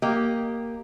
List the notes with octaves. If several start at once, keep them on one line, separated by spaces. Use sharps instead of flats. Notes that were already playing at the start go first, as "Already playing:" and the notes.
A#3 G4 D#5